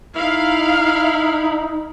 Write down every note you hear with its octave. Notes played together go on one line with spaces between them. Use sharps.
D#4 E4 F5